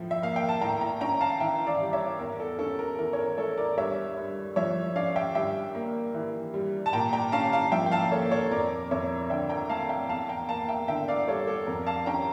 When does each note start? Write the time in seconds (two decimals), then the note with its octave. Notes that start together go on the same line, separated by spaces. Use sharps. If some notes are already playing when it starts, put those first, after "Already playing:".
Already playing: A2 F3
0.11 E5
0.22 A#3 F5
0.36 G5
0.49 A5
0.61 A2 G5 A#5
0.81 G5 A#5
1.01 C#4 G5 A#5
1.21 F5 A5
1.40 E3 E5 G5
1.67 D5 F5
1.80 G3
1.93 C#5 E5
2.19 E2 A#4
2.40 A4
2.59 C#4 A4
2.79 A#4
2.98 E3 A#4
3.13 C#5
3.19 A#4
3.38 A3 A4 C#5
3.57 A#4 D5
3.77 G2 C#5 E5
4.17 G2
4.56 F3 C#5 E5
4.96 C#4 D5 F5
5.16 E5 G5
5.35 G2 E5 G5
5.75 A#3
6.14 E3
6.54 G3
6.86 A5
6.93 A#2 G5 A#5
7.13 G5 A#5
7.32 C#4 F5 A5
7.52 F5 A5
7.72 F3 E5 G5
7.86 G5
7.92 F5 A5
8.12 A#3 A4 C#5
8.31 A4 C#5
8.51 F2 A#4 D5
8.91 F2 C#5 E5
9.30 D3 E5 G5
9.49 G5 A#5
9.70 A3 F5 A5
9.89 E5 G5
10.09 E2 F5 A5
10.29 G5 A#5
10.49 A#3 F5 A5
10.68 E5 G5
10.88 D3 E5 G5
11.08 D5 F5
11.28 G3 A4 C#5
11.47 A4
11.67 F2 A#4
11.87 F5 A5
12.06 C#4 G5 A#5